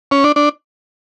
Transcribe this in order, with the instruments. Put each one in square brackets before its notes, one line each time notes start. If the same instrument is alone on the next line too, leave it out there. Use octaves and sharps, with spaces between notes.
[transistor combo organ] C#4
D4
D4